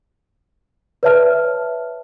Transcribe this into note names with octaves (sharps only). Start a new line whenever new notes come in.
B4 C#5 D5 E5 A5 F6